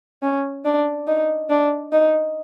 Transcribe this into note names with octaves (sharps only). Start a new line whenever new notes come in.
C#4
D4
D#4
D4
D#4